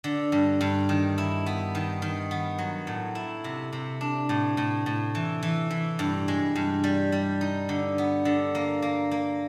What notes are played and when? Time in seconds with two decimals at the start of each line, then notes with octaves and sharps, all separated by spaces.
0.04 D3
0.32 G2
0.61 G2
0.89 D#3
1.18 E4
1.46 B3
1.75 D#3
2.02 D#3
2.31 B3
2.59 F#3
2.87 A2
3.15 E4
3.44 C3
3.73 C3
4.01 D4
4.29 A2
4.57 A2
4.86 A2
5.15 E3
5.43 E3
5.71 E3
5.99 G2
6.28 G#3
6.56 G2
6.84 G3
7.12 G3
7.41 D#4
7.69 D3
7.98 B3
8.25 D3
8.55 A#3
8.82 A#3
9.11 A#3